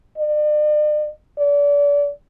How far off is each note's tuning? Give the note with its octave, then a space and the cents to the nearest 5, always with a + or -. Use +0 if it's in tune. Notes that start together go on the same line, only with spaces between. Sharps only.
D5 +45
D5 -35